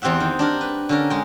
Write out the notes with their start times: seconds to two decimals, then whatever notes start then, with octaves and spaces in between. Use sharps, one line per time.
0.02 E2 C4 G4 E5 F#5
0.20 D#3
0.39 D4 G4 A#4
0.61 B4
0.89 D3 C#4 A#4
1.10 G#3 G5